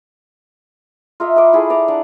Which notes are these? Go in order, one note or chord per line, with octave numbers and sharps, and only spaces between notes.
F4 A#4 D#5 E5
D#5 B5 D6
E4 G#4 A4
D5 A#5 D6
D4 F#5 D6